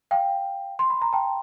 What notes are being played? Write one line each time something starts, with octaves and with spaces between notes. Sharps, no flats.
F5 G5
C6
B5
A#5
G5 A5